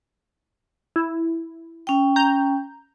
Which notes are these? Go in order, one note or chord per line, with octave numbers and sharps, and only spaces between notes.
E4
C#4 G5
A#5 G6